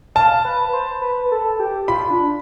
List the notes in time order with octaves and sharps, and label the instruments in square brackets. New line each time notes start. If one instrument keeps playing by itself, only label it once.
[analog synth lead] F5 [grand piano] A5
[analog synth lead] B4
C5
B4
A4
G4
[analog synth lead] F4 [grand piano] B5
[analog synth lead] D4